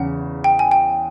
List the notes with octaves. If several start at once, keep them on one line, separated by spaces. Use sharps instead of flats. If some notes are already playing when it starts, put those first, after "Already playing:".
Already playing: E2 C#3 F#5
G5
G#5
G5